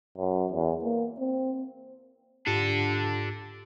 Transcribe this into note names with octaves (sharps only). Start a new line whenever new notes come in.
F#2
E2
A#3
C4
G#2 D4 F4 G4 A4